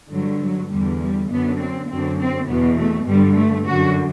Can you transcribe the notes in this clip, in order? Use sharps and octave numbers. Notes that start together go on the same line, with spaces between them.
G2 D3 F#3
F#3
E2 D3 G3
G3
F#2 D3 B3
C4
F#2 D3 C4
C4
E2 B2 B3
A3
G2 D3 G3
A3
F#2 D3 F#4